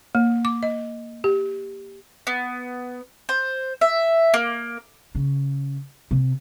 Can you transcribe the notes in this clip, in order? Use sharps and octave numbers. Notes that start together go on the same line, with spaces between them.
A#3
D6
D#5
G4
B3
C5
E5
A#3
C#3
C3